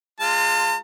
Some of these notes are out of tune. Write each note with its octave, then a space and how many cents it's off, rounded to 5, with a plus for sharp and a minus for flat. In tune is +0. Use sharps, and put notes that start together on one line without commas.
G#3 +0 F4 +0 A5 +45